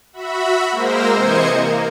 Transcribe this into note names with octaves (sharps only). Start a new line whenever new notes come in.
F#4 E5 B5
G#3 A#3 A#4 C5 E6 A#6
C3 E3 C5 D#5 G#6 C#7
A#3